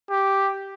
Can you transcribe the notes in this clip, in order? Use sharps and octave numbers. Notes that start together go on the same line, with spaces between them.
G4